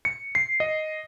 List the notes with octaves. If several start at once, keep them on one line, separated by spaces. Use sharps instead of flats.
C#7
C7
D#5